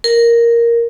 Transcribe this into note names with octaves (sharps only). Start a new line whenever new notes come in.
A#4